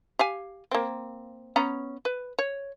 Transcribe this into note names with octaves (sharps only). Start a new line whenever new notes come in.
G4 F5 G#5
A#3 C4
B3 C#4 A#5
B4
C#5